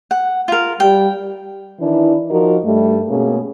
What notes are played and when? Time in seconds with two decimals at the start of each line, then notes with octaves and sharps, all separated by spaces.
0.11 F#5
0.48 F4 A#4
0.80 G3 G5
1.80 D#3 E3 D4 E4
2.30 F3 D#4 F#4 A#4
2.64 G2 G3 A3
3.09 B2 A#3 C#4 G#4